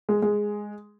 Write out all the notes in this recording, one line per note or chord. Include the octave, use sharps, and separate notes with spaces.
G#3
G#3